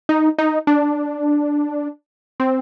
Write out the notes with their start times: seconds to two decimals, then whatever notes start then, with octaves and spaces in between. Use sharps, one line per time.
0.09 D#4
0.38 D#4
0.67 D4
2.40 C4